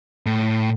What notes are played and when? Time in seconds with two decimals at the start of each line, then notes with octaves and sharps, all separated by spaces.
0.26 A2